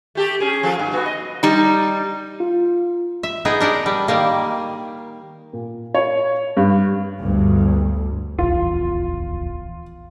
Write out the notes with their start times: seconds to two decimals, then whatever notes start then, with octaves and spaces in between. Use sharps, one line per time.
0.15 A3 G4 A4
0.40 C#4 G#4
0.63 F3 A4
0.79 G2
0.93 B3 F#4
1.05 D#5
1.43 G3 D#4
2.40 F4
3.23 E5
3.45 B3 D#4 G#4 G5
3.60 D4 A#4 F#5 G5
3.86 G3
4.08 D#3 G3 A#3
5.53 A#2
5.95 C#5
6.57 G2
7.21 G1 D2 G2
8.39 D1 A#1 E2 F4